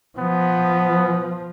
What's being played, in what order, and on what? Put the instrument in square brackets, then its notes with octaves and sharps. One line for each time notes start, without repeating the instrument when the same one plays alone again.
[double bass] F3 [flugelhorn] B3